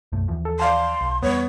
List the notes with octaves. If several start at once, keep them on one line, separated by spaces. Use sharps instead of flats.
B1 F#2 A3
D#2 E3 F3
A4
D5 F5 A5 C6
B1
E2 G3 B3 C#5